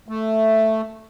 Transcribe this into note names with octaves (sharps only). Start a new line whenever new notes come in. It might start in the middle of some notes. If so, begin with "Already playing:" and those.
A3